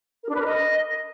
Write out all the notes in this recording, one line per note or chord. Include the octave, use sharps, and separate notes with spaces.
A#4
D4
B4
A#4
D#5